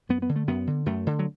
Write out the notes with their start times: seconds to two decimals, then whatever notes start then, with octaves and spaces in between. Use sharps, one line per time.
0.09 F#2 B3
0.22 B3
0.29 D3
0.36 A3
0.47 F#2 B3
0.67 D3
0.86 F#2 A3
1.07 D3
1.19 F#3